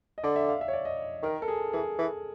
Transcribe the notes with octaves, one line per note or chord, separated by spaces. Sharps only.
D#5
D3 D5
E5
F5
E5
C#5
D5
D#5
D#3 A#4
A4
G#4
E3 G#4
E3